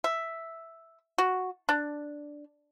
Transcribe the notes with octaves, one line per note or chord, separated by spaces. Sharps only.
E5
F#4
D4